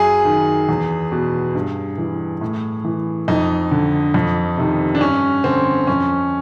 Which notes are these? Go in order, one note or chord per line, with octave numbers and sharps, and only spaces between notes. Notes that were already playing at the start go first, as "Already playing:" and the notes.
Already playing: F#2 G#4
D#3
E2
B2
G2
E3
A2
E3
F2 D#4
D3
F2
C3 D#3
D4
G2 C#4
D3 C4
F2 C#4